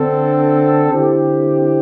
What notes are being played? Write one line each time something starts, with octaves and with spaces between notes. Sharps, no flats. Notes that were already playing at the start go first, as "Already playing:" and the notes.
Already playing: D3 C4 A4
D3 C4 E4 G4